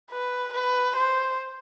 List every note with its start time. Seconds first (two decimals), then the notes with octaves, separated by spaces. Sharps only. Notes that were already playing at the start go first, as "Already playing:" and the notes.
0.11 B4
0.53 B4
0.96 C5